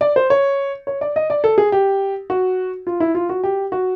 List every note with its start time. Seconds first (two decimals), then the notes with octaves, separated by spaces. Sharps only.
0.01 D5
0.16 C5
0.30 C#5
0.87 C#5
1.01 D5
1.16 D#5
1.30 D5
1.44 A4
1.58 G#4
1.72 G4
2.30 F#4
2.87 F4
3.00 E4
3.15 F4
3.29 F#4
3.44 G4
3.72 F#4